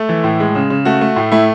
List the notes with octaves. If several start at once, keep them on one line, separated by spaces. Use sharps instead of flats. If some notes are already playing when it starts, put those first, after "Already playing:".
Already playing: A3 A4
E3
A2
G#3
C#3
C#3
A3 F#4
A3
A2
A3 E4